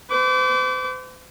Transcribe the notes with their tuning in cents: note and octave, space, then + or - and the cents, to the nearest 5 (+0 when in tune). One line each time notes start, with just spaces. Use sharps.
C5 -40 D6 -30